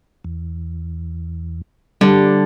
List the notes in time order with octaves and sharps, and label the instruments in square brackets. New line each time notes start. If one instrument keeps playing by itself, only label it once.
[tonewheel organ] E2
[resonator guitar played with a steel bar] D3 [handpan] G3